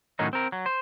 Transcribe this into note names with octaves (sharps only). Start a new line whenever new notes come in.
A2 D#3 F#3 C#4 D#4
C4 A#4
F#3
C5